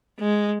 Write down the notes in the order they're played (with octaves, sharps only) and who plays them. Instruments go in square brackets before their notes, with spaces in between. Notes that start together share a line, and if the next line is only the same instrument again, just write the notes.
[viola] G#3